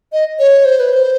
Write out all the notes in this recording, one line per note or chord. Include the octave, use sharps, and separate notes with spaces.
D#5
C#5
C5
B4
C5